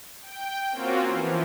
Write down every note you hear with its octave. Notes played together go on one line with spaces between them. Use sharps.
G5
A#3 C4 C#4 F4 F#4
E3 F3